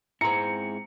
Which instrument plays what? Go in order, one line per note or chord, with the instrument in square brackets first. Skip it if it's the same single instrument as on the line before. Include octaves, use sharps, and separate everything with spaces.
[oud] G#2 C4 [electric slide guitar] E4 G#4 [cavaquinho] A#5 [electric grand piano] C#7